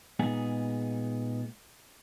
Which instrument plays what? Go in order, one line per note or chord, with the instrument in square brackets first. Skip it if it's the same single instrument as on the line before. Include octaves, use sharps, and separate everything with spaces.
[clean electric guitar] A#2 G#3 B3 D#4 G#4